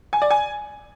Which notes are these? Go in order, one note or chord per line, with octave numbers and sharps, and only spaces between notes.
G#5
D5
G#5